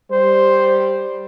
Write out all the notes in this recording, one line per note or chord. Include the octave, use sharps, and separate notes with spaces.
G3 C5